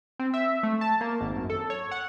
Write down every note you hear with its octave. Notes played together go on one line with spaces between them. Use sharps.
C4
E5
A3
A5
A#3
G#1
F#2
A4
C#5
F#5